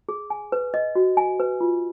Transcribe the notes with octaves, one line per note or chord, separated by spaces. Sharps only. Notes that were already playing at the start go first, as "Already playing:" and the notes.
G#4
G#5
B4
D#5
F#4
G#5
B4
F4